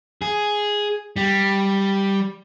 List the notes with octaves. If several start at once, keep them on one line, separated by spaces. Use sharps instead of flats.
G#4
G3